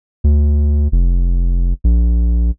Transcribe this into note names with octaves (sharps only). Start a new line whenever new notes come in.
D2
F1
A#1